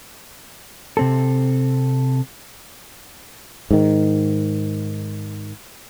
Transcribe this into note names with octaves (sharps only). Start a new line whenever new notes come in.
C3 C4 A4
G#2 D#3